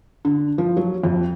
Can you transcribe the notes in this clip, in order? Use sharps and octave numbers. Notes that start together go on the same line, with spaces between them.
D3
F3
F#3
F2